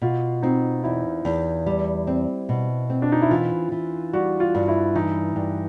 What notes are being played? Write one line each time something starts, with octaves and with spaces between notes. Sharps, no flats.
B2 F4
C4 D#4
E2 E4
E2
G3
C4
B2
C4
D4
D#4
E4
E3 F4
E3
G3 F#4
F4
G2
E4
E3 D#4
G2